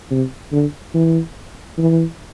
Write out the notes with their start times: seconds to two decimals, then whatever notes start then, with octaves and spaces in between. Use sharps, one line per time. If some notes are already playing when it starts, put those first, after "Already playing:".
0.11 C3
0.52 D3
0.94 E3
1.78 E3